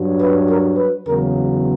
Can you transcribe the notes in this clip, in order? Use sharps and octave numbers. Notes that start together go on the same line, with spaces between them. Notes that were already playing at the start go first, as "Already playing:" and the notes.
Already playing: G2 F#3
B4
A#4
B4
E2 C#3 F#3 A#4